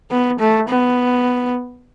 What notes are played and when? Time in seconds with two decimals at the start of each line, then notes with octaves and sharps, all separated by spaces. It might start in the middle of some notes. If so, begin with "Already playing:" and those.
0.11 B3
0.40 A3
0.68 B3